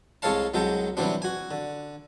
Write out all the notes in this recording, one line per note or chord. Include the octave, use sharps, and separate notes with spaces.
C2 G#3 A4 C#5 F5 A5
C2 F#3 G#3 A4 G5
C3 E3 F#3 G3 C4 D4
F#4 G#5
D3